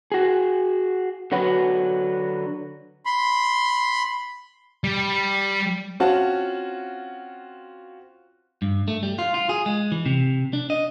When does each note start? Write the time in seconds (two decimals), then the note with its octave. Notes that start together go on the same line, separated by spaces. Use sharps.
0.12 F#4 G#4
1.32 D3 F#3 F#4 B4
3.05 B5 C6
4.84 G3
6.00 C4 C#4 F4 F#4 F#5 A5
8.62 G2
8.88 A3
9.03 G3
9.19 F4
9.34 F4
9.49 G#4
9.66 G#3
9.92 E3
10.06 C3
10.53 D4
10.70 D#5